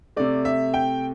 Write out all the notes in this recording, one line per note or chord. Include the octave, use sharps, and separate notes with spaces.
C3 A3 D5
E5
G5